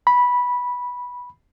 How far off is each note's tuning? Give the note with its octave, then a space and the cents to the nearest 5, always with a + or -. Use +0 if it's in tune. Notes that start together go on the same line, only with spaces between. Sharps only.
B5 -10